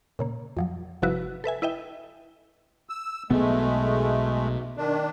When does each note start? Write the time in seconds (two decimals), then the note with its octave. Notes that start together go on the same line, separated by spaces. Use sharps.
0.19 A#2 C#3 A#3
0.57 F2 F3 F#3
1.02 G1 C3 F3 E4 F#4 B4
1.44 A4 B4 E5 G#5
1.62 E4 B4 D#5 E5 G5
2.89 E6
3.30 B1 B2 G#3 A3 B3
4.77 D#3 D4